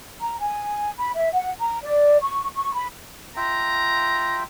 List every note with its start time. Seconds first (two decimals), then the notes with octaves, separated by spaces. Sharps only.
0.19 A#5
0.40 G#5
0.98 B5
1.16 E5
1.34 F#5
1.59 A#5
1.82 D5
2.21 C#6
2.56 C#6
2.74 B5
3.37 F4 E5 G5 A#5